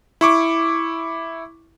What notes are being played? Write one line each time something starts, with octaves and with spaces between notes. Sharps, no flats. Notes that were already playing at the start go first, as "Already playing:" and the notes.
E4 C#6 D6